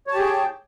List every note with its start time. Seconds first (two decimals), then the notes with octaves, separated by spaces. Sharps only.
0.07 C#5
0.11 A5
0.14 G4
0.18 G#4
0.21 G5